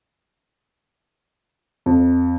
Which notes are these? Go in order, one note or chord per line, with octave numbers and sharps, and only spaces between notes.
F2